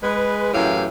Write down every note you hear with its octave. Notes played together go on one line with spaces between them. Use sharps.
G#3 B4
F#2 A2 E3 G4 F5